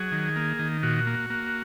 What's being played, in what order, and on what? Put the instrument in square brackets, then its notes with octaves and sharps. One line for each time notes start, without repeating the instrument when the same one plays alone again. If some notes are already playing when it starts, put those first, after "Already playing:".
Already playing: [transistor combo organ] F#3 G#4
D#3
A#3
D#3
A#2 F#4
A#3
A#3